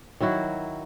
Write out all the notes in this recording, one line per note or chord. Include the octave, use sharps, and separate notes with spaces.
D#3 F#3 E4 F#4